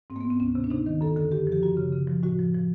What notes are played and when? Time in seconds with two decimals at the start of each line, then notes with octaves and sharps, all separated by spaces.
0.10 G#2 C4
0.16 A#3
0.21 B3
0.25 G#2
0.30 C4
0.40 D2 C#4
0.55 C3
0.64 D4
0.71 C3 D#4
0.86 D#3
1.01 F#2 A4
1.16 D3 A4
1.32 F#2 G4
1.47 F3 G4
1.63 F#2 F#4
1.77 C#3
1.93 C#3
2.08 F3
2.23 A2 F#4
2.39 F3
2.55 F3